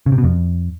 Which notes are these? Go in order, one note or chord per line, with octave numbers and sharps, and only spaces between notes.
C#3
C3
B2
F2